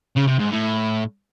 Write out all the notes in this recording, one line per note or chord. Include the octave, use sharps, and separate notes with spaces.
C#3
C3
G#2
A2